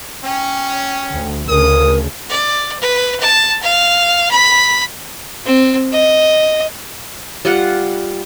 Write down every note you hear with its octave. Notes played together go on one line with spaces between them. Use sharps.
C#4 G5
D2
D2 C#3 A#4 D#6
D5
B4
A5
F5
B5
C4
D#5
G3 F4 F#5